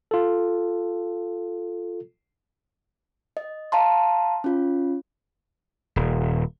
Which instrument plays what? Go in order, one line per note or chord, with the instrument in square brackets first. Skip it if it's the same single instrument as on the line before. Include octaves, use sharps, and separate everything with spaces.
[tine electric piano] F4 A4
[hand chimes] D#5
F5 A5 A#5 C6
C#4 F4
[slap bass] D#1